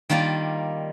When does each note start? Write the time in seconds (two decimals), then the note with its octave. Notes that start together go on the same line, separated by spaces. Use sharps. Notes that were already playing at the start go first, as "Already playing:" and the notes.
0.10 D#3 G3 A#3 F4 D5